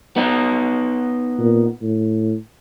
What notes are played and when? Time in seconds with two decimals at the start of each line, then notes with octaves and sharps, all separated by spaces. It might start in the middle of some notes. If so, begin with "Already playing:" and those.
0.16 B3 D#4
1.39 A#2
1.82 A2